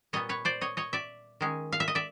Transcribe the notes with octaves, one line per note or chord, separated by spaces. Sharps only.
A#2 G3 B3 C#5 D#5
B4 C#5
C5 D5
C#5 D#5
C#5 D#5
D5 E5
D#3 G#3 C#4
F5
E5
D#5
D5 E5